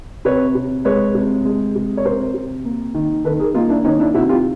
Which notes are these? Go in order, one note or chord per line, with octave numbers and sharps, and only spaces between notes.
C3 B4 C#5
C3
G#3 B4 C#5
C3
G#3
C3
C#5
C3 A#4 C5
C3
A#3
D#3
D#3 A4 B4
G#4 A#4
A#3 D#4 F4
D4 E4
D#3 C#4 D#4
D4 E4
C3 E4 F#4
F4 G4